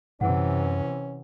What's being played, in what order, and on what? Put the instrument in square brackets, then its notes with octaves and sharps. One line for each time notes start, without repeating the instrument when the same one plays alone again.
[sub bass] F#2 [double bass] C3 E3 [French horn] C#4 [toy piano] F#5